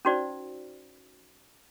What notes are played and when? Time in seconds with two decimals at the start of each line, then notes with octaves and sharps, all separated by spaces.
0.05 C#4 D#4 F#4 C5 D5